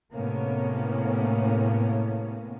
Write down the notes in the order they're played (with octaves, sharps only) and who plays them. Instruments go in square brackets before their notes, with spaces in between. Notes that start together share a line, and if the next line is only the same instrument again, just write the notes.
[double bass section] A2 C3 A#3 B3 C#4